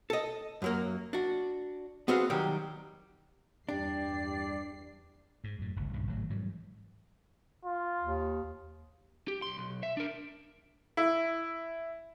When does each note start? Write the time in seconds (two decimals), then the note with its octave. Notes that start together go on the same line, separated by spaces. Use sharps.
0.10 A4 D#5
0.62 F#2 F#3 A#3
1.13 D4 F#4
2.08 B3 C4 F#4 G#4 B4 F5
2.30 D#3 F#3 G3 G4
3.69 E2 G2 D4 G4 D5 C7
5.44 G#2
5.59 F#2 A2
5.76 G1 C#2
5.93 C2 G2 A#2 C#3
6.07 G#1 A2 E3 F#3
6.30 G#2 E3 F#3 G3
7.65 F4
8.01 D#2
9.28 G4
9.42 B1 C6
9.58 B1
9.83 E5
9.97 D4 A#4
10.97 E4